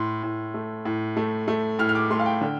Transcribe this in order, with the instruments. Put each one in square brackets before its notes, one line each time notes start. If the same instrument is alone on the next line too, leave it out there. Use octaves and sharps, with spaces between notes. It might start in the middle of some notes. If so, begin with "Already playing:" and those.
Already playing: [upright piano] A2 C6
A2
A3
A2
A3
A3
A2 F6
F6
D6
A3 C6
F5
G5
D3